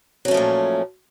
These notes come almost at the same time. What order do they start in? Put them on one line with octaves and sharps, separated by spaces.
F#3 C#4 A3 F3 A#2